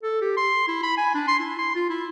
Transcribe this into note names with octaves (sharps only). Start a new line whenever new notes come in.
A4
G4
C6
E4
B5
G#5
D4
C6
E4
C6
F4
E4